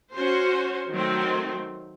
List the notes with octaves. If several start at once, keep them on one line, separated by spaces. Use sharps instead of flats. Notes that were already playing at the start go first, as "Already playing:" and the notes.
C#4 F#4 C5
D#3 F#3 A3 C4